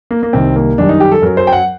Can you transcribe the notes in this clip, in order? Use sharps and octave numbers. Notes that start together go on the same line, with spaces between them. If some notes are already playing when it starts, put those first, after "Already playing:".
A#3
A#3
C2 C3 D#3 C4
A#3
F#2 D#3 G3 D4
D#4
G4
A4
F#2 F#3 A#4
C5
G5
F#5